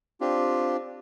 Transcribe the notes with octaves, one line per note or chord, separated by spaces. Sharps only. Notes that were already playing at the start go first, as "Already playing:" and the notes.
C4 D4 F4 G4